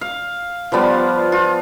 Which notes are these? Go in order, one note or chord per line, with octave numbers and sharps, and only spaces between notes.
F5
F3 G3 B3 F4
F4